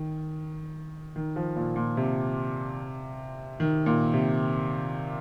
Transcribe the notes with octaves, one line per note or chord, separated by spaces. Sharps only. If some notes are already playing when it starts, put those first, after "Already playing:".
Already playing: D#3
D#3
F3
A#2
A#2
C3
D#3
A#2
C3